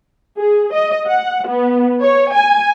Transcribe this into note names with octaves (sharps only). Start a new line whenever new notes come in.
G#4
D#5
F#5
B3
C#5
G#5